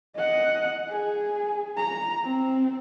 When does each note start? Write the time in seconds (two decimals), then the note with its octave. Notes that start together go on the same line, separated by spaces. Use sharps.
0.16 D#5 F#5
0.90 G#4
1.77 A#5
2.24 C4